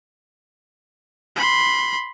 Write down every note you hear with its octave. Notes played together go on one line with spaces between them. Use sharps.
B5 C6